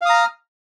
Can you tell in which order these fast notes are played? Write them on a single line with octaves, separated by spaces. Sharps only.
F5 D#6 A#5 F6